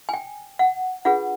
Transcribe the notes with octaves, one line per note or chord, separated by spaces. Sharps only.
G#5
G5
F#5
D4 F4 G#4 B4 F#5